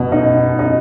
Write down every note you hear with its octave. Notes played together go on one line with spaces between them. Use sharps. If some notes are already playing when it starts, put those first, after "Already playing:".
Already playing: B2
D#4
D#4